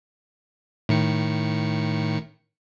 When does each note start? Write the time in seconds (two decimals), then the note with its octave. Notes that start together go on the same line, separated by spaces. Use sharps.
0.89 A2 D#3 C#7